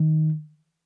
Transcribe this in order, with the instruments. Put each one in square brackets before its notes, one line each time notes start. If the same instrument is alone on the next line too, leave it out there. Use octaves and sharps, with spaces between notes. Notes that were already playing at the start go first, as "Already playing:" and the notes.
Already playing: [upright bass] D#3